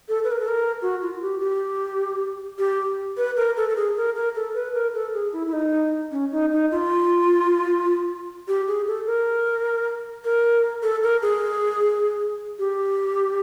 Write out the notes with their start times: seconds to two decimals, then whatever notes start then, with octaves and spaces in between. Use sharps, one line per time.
0.08 A4
0.23 B4
0.31 A#4
0.39 A4
0.48 A#4
0.81 F#4
1.01 F4
1.21 G4
1.40 G4
2.58 G4
3.17 B4
3.36 A#4
3.56 A4
3.69 A4
3.76 G#4
3.96 A#4
4.15 A#4
4.35 A4
4.54 B4
4.74 A#4
4.93 A4
5.13 G#4
5.32 E4
5.47 E4
5.52 D#4
6.11 C#4
6.31 D#4
6.51 D#4
6.71 F4
8.47 G4
8.67 G#4
8.86 A4
9.06 A#4
10.24 A#4
10.82 A4
11.03 A#4
11.22 G#4
12.59 G4